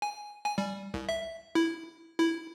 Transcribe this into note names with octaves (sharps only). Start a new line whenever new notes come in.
G#5
G#5
G3
C2
E5
E4
E4